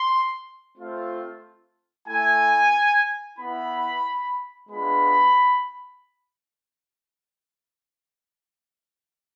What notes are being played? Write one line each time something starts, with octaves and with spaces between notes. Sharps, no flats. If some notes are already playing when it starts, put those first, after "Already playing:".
Already playing: C6
A3 C4 F4
A3 E4 G#5
B3 E4 B5
G#3 B3 D4 F4 B5